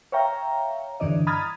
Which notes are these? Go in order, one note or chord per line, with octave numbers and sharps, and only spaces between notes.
C#5 E5 F5 G5 A#5
G2 D3 E3 D4 D5 D#5
A#5 B5 D#6 F6 G#6 A6